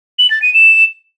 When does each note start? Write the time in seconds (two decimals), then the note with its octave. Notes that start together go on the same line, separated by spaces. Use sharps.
0.19 F#7
0.30 A6
0.42 D#7
0.54 E7